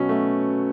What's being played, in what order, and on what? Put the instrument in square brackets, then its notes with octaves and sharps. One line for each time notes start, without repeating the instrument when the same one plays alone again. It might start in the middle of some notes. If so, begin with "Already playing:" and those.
Already playing: [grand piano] B2 F#3 B3 [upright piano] C#4
[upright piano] A3